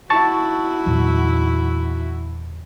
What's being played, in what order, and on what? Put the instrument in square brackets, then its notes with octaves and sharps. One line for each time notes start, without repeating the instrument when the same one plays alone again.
[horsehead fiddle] E4 F#4 [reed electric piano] A5 C#6 A6
[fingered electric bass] E2 A#2 F#3